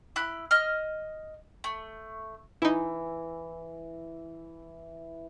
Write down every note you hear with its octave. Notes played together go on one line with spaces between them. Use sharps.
E4 B5 F#6
D#5 F6
A3
E3 D#4 E4